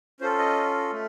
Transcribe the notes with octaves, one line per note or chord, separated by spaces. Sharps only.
C#4 F4 A4 C5
D#5
A3